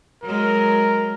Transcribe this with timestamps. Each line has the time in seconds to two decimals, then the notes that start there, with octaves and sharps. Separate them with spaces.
0.24 F#3 G#3 A#4